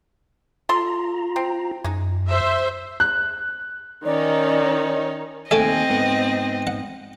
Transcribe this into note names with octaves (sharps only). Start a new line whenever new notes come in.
F4 A4 A5 A#5 C6
C4
F#2 G#3 D#4
C5 E5
F#6
D#3 C#4 D#4 C#5 D5
D#2 A3 C4 A4 D#5 E5 G5 G#5
G#2 B3
F#5